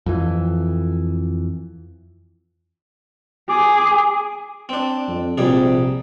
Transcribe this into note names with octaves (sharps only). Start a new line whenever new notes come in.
F2 E3
G#4 D6
C4 D4
F2
A#1 C3 G3 G#4